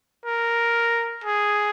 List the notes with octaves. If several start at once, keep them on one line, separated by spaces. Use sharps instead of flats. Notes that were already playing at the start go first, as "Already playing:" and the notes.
A#4
G#4